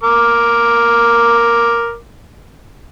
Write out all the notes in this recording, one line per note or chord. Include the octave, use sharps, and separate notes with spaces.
A#4 D6